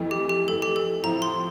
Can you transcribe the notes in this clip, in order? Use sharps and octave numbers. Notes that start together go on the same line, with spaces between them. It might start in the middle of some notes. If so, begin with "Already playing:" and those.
Already playing: F2 E3 A3
G4
G4
F2 E3 A3 A4
G4
A4
A2 F3 C4 E4 A#5
C6